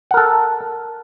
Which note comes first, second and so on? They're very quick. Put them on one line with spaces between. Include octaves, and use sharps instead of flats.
F#5 A#4 A4